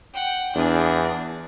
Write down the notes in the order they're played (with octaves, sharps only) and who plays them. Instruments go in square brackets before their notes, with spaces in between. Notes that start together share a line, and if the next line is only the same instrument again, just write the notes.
[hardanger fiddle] F#5 G5
[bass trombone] E2 [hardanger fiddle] D4 G#4